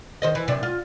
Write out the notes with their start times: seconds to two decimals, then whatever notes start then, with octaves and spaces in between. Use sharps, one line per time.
0.22 D#3 C5 D#5
0.35 E3
0.48 F#2 C3 D4
0.63 F4